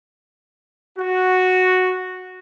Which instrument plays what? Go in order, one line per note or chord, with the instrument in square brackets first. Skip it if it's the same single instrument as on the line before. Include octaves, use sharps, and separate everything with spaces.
[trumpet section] F#4